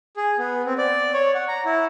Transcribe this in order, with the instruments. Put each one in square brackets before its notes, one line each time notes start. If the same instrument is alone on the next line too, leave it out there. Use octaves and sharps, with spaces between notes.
[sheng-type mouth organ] G#4
B3
C4
D5
C#5
F#5
A#5
E4